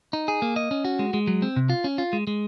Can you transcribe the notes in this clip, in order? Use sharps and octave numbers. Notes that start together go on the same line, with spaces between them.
D#4
G#4
A#3
D#5
C#4
F#4
G#3
G#3
F#3
C4
C3
F4
C#4
F4
G#3
G#3